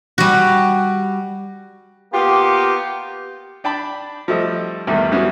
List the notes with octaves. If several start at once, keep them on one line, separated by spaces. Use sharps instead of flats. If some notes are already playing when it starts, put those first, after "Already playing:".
G3 F#4
A#3 B3 F4 G4
D4 G5 A5 B5
F3 G3 A3 A4 D#5
E2 G2 D#3 G3 A3
G#2 E3 F#3 G3 B3 C#4